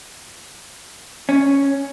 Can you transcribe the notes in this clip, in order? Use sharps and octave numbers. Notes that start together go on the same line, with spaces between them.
C#4